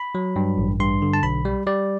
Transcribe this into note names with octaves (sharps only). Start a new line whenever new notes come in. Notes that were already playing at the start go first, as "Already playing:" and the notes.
Already playing: B5
F#3
G2
A1
G2 C6
D3
A5
B1 B5
G3
G3 D5